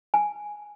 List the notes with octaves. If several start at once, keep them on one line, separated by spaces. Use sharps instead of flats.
G#5